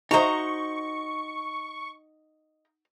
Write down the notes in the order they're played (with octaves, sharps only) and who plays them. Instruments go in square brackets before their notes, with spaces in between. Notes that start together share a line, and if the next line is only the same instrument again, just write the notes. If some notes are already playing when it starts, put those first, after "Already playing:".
[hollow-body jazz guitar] D#4 F#4 C5 [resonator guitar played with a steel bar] D#5 A#5 [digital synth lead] C#6